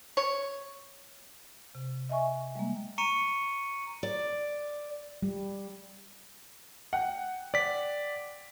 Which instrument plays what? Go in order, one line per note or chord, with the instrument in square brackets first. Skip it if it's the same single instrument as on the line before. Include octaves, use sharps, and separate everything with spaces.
[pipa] C#5
[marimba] C3
D#5 E5 G#5 C#6
G3 G#3 A#3
[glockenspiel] A#5 C#6 C#7 D#7
[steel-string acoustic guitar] D5
[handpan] G3
[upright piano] F#5 G5
[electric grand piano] D5 B6